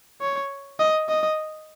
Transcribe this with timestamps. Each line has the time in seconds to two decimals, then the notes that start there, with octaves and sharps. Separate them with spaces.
0.21 C#5
0.79 D#5
1.09 D#5